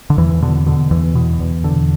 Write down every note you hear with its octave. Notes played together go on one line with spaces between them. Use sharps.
D3
E2 E3
B2 D3
B2 D3
E2 E3
B2
E2
D3